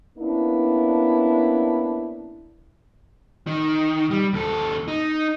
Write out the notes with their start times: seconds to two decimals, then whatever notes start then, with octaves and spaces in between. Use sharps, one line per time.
0.18 A#3 B3 C#4 D4 E4
3.47 D#3
4.10 G3
4.33 D#2 A4
4.88 D#4